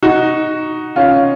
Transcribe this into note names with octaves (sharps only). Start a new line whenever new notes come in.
D#4 F#4
C#4 F4